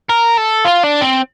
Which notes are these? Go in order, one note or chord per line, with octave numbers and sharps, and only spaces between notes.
A#4
A4
F4
D4
C4